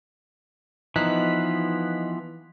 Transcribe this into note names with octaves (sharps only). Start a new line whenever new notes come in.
E3 F3 B3 D#4 F#6 B6